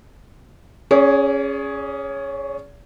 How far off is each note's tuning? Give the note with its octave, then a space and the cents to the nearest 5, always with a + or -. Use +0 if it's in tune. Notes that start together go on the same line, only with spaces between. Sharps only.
C#4 +0 G#4 +0 D5 -45